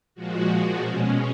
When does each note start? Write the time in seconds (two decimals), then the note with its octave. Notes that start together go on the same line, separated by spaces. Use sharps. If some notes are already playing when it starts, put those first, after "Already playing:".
0.15 A#2 F3 G#3 F#4
0.81 B2 G#3 C#4